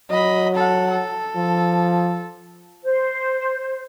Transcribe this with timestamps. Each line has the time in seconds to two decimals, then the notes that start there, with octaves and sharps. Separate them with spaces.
0.11 F#3 D#5 B5
0.55 A4 F#5
0.90 A4
1.36 F3
2.84 C5